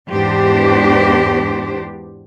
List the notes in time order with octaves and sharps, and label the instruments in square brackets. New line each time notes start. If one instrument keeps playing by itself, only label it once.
[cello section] E2 G#2 B3 D4 G4 C5